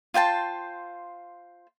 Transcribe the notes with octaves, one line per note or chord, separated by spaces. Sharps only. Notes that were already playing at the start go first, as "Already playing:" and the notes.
F4 C5 G5 A5